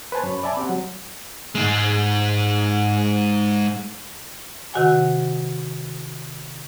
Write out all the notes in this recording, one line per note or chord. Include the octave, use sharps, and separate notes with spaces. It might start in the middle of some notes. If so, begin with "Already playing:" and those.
B4 C5 G#5 A5
F#2 C#5 B5
D5 E5 G#5 A5 B5 D6
C4 G4 F#5
F#3
G#2 G#3
C3 D#3 F#4 F#5 G#5